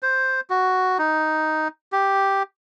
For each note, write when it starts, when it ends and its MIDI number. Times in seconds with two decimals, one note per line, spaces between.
0.03 0.41 72
0.50 0.98 66
0.98 1.68 63
1.92 2.43 67